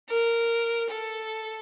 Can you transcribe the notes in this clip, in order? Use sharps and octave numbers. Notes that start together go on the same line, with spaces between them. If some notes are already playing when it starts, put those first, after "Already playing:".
A#4
A4